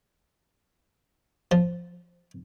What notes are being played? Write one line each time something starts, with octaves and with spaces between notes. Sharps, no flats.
F3